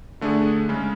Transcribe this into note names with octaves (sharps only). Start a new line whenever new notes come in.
D3 A3 D4 G#4
C#3 G#3 C#4